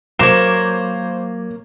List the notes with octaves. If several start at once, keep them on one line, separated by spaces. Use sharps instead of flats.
F#3 A#3 C5 C#5 D6 G#6 E7